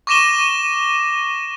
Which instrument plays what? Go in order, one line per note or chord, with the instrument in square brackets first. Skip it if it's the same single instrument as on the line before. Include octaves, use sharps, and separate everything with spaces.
[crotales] C#6 D6 A#6 D#7 E7 G7